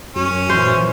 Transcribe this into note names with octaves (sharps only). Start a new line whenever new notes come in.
F#2 C#4 C#5
A#2 E3 C5